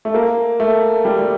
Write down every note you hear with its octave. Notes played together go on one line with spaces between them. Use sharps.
A3
A#3
A3
G3
G3